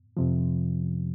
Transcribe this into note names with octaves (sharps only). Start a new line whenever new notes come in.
F2 C3 F3